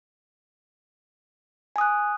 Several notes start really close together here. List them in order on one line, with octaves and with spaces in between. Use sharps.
G#5 D#6 F#6